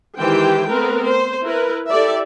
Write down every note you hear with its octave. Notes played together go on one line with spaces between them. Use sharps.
D#3 E3 G#3 G4 C5 G5
A3 B3 C4 A#4 B4
C5
E4 A#4 B4
E4 G4 A4 D5 E5